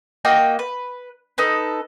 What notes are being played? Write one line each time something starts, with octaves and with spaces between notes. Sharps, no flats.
A#3 F#4 D#5 G5
B4
D#4 A4 B4